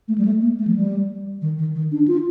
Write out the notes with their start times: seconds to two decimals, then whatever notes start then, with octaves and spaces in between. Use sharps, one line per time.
0.08 A3
0.18 G3
0.25 A3
0.42 A#3
0.59 A3
0.67 F3
0.76 G3
1.42 D#3
1.58 D#3
1.75 D#3
1.92 D4
2.08 F4